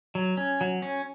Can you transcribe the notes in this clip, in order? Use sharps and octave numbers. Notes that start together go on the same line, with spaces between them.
F#3
C#4
F#3
C#4